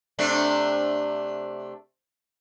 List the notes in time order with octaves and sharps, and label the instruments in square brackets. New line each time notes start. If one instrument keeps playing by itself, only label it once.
[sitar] C3 A3 D4